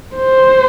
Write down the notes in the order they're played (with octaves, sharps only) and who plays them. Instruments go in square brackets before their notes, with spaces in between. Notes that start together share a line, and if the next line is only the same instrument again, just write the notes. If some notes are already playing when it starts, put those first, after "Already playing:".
[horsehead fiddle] C5